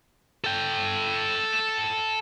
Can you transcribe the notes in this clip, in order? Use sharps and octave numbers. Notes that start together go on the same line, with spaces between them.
A4 G5